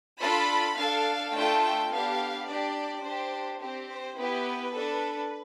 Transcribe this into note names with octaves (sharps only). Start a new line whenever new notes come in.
D4 F4 A4 B5
D4 A4 F5
A3 D4 F4 A4 G5
G5
B3 D4 G4 F5
D4 G4 D5
D4 G4 C5
C4 G4 C5
C5
B3 E4 G4 B4
D4 A4